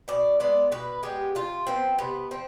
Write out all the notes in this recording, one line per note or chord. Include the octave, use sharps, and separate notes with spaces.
B2 D5
G#3 B3 D5
B2 B4
G#3 B3 G4
C3 F4
F3 B3 C4
C3 B3
F3 C4